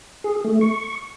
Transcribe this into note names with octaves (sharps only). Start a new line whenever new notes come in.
G#4
A3
C#6